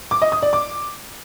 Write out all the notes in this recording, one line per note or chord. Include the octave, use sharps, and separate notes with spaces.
D6
D#5
D#6
D5
D6